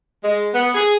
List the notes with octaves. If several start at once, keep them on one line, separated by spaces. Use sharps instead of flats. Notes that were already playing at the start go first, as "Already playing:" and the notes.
G#3
B3
G#4